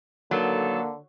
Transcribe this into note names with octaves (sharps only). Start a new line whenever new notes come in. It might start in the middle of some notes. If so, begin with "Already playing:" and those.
D3 D#3 F#3 A#3 B3 A4